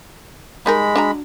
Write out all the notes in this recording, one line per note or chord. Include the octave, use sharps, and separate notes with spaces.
G3 G#3 D#4 A#4 B5
D4 F#4 A#5